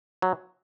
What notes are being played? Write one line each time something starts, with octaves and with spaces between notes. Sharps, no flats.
F#3